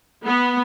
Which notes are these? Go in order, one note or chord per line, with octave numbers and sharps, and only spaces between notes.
B3